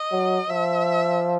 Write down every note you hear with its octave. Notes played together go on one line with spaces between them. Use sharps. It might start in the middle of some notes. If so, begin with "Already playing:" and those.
Already playing: D#5
F#3
F3 E5